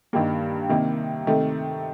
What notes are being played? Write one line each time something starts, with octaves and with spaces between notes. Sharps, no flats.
G2 D#3 G3 A#3
C3 D#3 A#3
C3 D#3 A3